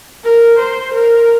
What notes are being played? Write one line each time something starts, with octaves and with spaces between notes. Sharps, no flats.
A#4
C5
A#4